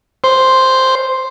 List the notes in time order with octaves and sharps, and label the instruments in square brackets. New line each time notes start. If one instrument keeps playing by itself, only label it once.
[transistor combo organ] C5